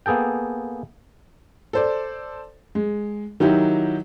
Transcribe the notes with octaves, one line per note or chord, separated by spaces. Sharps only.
A#3 B3 G#4 A4 G5
A4 C5 D5
G#3
D#3 F#3 D#4 E4 G4